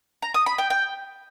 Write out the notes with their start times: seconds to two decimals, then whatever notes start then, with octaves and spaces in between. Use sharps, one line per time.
0.22 A#5
0.34 D#6
0.46 B5
0.58 G5
0.70 G5